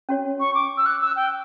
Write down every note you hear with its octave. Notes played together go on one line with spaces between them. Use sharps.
C#4 F#4 C#5
C#6
D6
E6
F#6
E6
G5